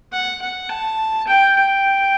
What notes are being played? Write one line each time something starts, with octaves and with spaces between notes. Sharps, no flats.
F#5
F#5
A5
G5
G5